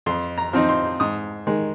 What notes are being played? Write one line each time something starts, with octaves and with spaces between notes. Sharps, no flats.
F2 C6
A#5
F3 C4 D#4
C6
G#2 D#6
D#3 G#3